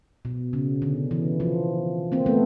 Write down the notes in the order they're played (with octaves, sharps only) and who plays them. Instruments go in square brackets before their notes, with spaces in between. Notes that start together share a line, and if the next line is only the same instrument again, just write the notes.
[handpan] B2
C#3
D3
E3
F3
A#3 C4
A3 B3